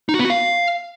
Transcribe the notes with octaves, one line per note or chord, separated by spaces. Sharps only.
D#4
F#4
B3
F#4
F5